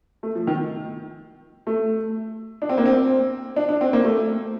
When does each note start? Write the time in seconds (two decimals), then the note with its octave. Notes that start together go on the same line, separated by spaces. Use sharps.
0.23 A3
0.35 F3
0.47 D#3
1.67 A3
2.62 D4
2.69 C4
2.77 A#3
2.85 C4
3.56 D4
3.69 D4
3.81 C4
3.93 A#3
4.04 A3